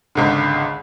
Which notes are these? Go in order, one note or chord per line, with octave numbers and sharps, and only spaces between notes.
G#1 C#2 D3